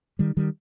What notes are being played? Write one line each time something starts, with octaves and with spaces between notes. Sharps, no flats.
D#3 G3
D#3 G3